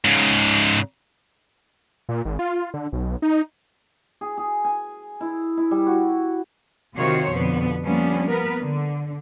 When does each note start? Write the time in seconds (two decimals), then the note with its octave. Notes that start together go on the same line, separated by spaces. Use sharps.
0.04 G#2 C#3
2.09 A#2
2.25 G#1
2.39 F4
2.74 D3
2.92 B1
3.22 D#4
4.21 G#4
4.38 G#4
4.65 G#5
5.21 E4
5.57 E4
5.71 G3
5.87 F#4
6.96 C3 D#3 F4 F#4 C5 C#5
7.31 F2 B2 D3 B3
7.83 F3 G3 A#3 B3 C#4 D4
8.28 B3 A#4 B4
8.61 D3